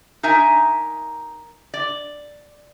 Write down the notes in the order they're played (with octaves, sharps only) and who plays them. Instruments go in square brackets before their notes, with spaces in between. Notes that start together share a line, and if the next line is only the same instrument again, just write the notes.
[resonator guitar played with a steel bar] D#4 A#4 E5 G#5
D5